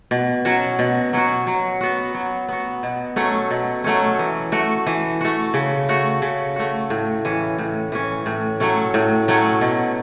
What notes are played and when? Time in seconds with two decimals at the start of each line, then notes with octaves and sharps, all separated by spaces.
0.11 B2
0.45 F#3 C#4 F#4
0.79 B2
1.13 F#3 C#4 F#4
1.47 F#3
1.81 B3 F#4
2.14 F#3
2.49 B3 F#4
2.83 B2
3.16 F#3 A3 C#4
3.51 B2
3.84 F#3 A3 C#4
4.19 E3
4.52 A3 F#4
4.86 E3
5.21 A3 F#4
5.54 C#3
5.89 A3 F#4
6.22 C#3
6.56 A3 F#4
6.90 A2
7.25 E3 C#4
7.58 A2
7.92 E3 C#4
8.26 A2
8.60 F#3 A3 C#4
8.94 A2
9.28 F#3 A3 C#4
9.61 B2